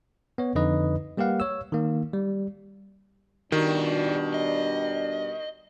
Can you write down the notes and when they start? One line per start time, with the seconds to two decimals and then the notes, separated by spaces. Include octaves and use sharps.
0.38 B3 C#5
0.55 F2 D3 D#4 B4 D#5
1.17 G3 A#3 G4 B4 F5 F#5
1.40 C#5 E6
1.72 D#3 A#3
2.13 G3
3.52 B2 D#3 G3 D4 F#4 G4
4.34 D#5